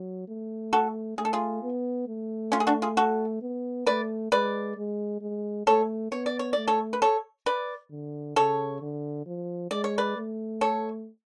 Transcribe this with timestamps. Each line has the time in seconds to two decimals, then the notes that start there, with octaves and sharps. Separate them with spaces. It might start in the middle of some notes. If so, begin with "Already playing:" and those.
Already playing: F#3
0.28 A3
0.73 F#4 A4
1.17 A3 G#4
1.25 A4
1.33 F4 G#4
1.63 B3
2.08 A3
2.52 C#4 F4
2.60 G#4
2.67 D4 F#4
2.82 F4 G#4
2.97 F#4 A4
3.42 B3
3.86 A3 B4 D5
4.32 G#3 B4 D5
4.77 G#3
5.21 G#3
5.67 A3 A4 C#5
6.11 B3 C#5
6.26 D5
6.39 C#5
6.53 A3 D5
6.68 A4 C#5
6.93 B4
7.02 A4 C#5
7.46 B4 D5
7.91 D3
8.36 C#3 A4 C#5
8.82 D3
9.26 F3
9.71 G#3 D5
9.84 C#5
9.98 B4 D5
10.17 A3
10.61 A4 C#5